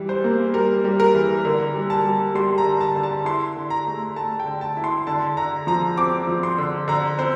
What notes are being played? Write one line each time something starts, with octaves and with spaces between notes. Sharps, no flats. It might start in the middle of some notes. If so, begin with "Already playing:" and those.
Already playing: E3 G3
C5
A#3
G3 A#4
G3
A#4
E3
D3 A#4
G3
A5
G3
G3 C6
A#5
D3
A5
D3
A5
E4 C6
D3
A#5
A3
A3 A5
G5
D3
A5
E4
C6
D3 A5
D3 A#5
F3 A#5
C4 D6
F3
C6
D3
D3 A#5
C4 C5